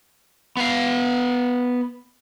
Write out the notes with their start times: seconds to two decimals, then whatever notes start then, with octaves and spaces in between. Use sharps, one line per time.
0.57 B3 F5